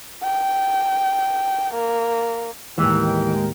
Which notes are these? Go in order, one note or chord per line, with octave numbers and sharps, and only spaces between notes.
G5
A#3
D#2 A2 E3 G#3 G4 A#4 G5